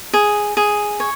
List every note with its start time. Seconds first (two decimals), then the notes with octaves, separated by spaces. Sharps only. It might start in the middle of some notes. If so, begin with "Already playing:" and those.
0.13 G#4
0.57 G#4
1.00 C#5